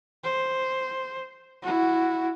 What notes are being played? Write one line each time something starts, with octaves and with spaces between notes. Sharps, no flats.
C5
E4 F#4